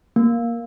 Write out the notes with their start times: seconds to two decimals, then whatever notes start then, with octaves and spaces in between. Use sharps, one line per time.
0.16 A#3